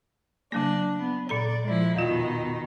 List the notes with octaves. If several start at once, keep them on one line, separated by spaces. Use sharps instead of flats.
C#3 F#3 A#3 D4
B3
A#2 A4 D5 A#5
F3 G#3 E4
E2 B2 D#3 D#4 F4